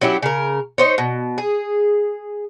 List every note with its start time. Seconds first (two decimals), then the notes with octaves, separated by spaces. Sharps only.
0.01 F#3 C#4 E4 G4
0.22 C#3 A#4
0.78 D#4 C5 C#5
0.98 B2
1.38 G#4